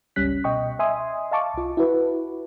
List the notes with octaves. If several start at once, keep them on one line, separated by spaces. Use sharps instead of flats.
G1 C#2 G3 C#4 F#6 B6
B2 D#5 G5 C#6
D#5 E5 G#5 C6 D#6
D#5 F5 A5 C#6 D6
C2 F4
E4 F#4 B4